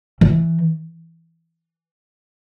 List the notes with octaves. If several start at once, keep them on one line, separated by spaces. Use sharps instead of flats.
E3